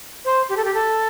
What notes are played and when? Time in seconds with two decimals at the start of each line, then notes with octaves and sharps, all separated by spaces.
0.25 C5
0.49 G4
0.57 A4
0.64 G4
0.74 A4